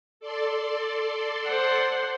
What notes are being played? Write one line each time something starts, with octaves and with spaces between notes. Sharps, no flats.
A4 D5 C6
C5 F#5